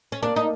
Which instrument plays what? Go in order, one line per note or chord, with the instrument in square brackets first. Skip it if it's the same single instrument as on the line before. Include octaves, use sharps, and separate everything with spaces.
[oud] C#4
[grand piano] A#3 [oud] D4
[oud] D#4